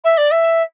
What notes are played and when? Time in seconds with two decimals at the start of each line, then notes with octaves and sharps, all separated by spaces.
0.04 E5
0.17 D5
0.31 E5